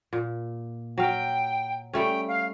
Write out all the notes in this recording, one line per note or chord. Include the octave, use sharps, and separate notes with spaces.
A#2
F#3 F5 G5
G3 A3 C#4 G5
F5